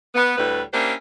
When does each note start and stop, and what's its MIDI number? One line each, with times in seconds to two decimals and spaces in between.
0.15 0.35 59
0.37 0.62 38
0.37 0.62 45
0.37 0.62 50
0.37 0.62 55
0.37 0.62 57
0.37 0.62 71
0.73 0.93 58
0.73 0.93 61
0.73 0.93 62
0.73 0.93 64
0.73 0.93 67
0.73 0.93 72